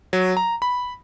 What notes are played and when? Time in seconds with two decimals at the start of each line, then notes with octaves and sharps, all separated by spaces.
0.13 F#3
0.37 A#5
0.62 B5